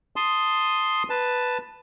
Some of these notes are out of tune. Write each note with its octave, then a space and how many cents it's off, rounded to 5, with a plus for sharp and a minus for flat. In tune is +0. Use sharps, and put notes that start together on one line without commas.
A5 +0 C6 +0 D#6 +0
B4 +0 A5 +5